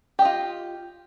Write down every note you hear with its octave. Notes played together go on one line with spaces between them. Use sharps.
F4 G4 D#5